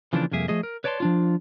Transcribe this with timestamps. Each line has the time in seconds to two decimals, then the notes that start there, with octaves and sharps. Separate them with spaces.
0.13 C#3 E3 F3 A#3 C4 D4
0.31 C2 F2 A#3 G#4 E5
0.48 F3 A3 G#4 D#5
0.63 A#4
0.84 B4 C#5 D5 A5 B5 C6
1.00 F3 D4 F4